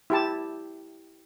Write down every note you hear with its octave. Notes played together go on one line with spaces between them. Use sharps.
E4 G4 A5